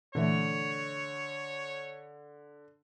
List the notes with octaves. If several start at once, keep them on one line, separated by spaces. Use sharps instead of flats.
A#2 D3 E3 A3 C#5